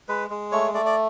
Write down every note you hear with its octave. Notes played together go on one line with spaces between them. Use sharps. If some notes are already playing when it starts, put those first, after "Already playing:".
G#3 B4
G#3
A3 C#5
A3 D5
D5